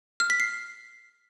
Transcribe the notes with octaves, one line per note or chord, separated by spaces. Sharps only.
F6
B6
C7